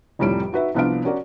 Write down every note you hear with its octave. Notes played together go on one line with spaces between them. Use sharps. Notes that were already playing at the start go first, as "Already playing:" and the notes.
F1 F2 A2 G3 C#5 D7
D#4 F#4 B4 E5
C2 F3 B3 D4 F5 D7
C#4 F#4 A#4 D5